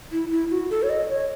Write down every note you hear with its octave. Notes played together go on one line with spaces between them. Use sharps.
E4
E4
F#4
A4
C#5
D#5
C#5